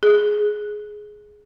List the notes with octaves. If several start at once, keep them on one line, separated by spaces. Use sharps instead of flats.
G#4